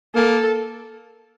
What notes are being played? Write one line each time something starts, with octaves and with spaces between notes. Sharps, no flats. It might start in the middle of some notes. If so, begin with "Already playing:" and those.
A#3 A4